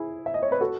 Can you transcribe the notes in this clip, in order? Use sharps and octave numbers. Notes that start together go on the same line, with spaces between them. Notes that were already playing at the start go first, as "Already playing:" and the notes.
Already playing: E4 G#4
E5
D#5
C#5
B4
F#4 A4